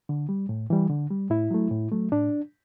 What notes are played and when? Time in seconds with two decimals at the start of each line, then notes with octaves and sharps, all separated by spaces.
0.09 D3
0.29 G3
0.49 A2
0.70 E3 G3
0.90 D3
1.11 G3
1.30 A2 E4
1.51 F#3 A3
1.71 A2
1.91 F#3 A3
2.12 A2 D4